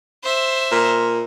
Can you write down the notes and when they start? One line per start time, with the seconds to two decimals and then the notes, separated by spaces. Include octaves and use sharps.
0.23 C5 E5
0.71 A#2